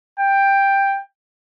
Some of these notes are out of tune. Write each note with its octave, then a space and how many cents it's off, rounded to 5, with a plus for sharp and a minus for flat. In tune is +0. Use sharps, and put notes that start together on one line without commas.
G5 +10